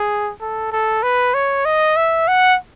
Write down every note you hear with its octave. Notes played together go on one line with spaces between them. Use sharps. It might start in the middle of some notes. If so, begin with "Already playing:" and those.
Already playing: G#4
A4
A4
B4
C#5
D#5
E5
F#5